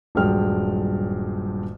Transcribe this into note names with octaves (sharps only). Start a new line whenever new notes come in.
D#1 G2 F#3 G#3 G5 F6